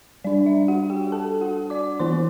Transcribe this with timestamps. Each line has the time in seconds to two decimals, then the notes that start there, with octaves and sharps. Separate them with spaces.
0.24 G3 D4 D5
0.46 E5
0.68 F#4 F#5
0.90 G4 G5
1.12 A4 A5
1.41 F#4 F#5
1.70 D5 D6
1.99 E3 B3 E4 C5 C6